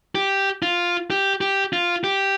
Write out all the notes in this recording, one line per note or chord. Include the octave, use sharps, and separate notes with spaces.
G4
F4
G4
G4
F4
G4